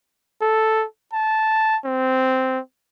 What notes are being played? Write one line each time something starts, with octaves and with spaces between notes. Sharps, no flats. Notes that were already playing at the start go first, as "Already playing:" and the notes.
A4
A5
C4